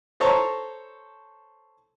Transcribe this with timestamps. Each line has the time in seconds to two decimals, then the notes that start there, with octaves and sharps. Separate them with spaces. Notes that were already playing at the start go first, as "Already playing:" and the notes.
0.20 A4 C5 C#5 A5 A#5